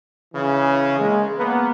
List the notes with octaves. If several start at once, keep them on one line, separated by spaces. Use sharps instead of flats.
C#3 E3
G#3 A#3
A#3 B3